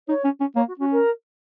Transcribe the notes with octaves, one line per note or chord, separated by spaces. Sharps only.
D#4 C#5
C#4
C#4
A#3 C#5
F#4
C#4 F#4
A#4